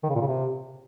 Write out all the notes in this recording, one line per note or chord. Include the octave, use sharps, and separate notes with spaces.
D#3
C#3
A#2
C#3
C3